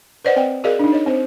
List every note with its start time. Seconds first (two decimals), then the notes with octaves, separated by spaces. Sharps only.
0.25 B4 C5 D5 D#5 F#5
0.36 C4 D5 G5
0.64 F#4 G#4 A#4 D5 D#5 F5
0.79 D4 D#4
0.92 C#5 D#5
1.06 C4 C5